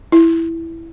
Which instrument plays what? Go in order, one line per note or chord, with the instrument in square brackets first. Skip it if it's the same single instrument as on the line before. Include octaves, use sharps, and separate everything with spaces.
[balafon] E4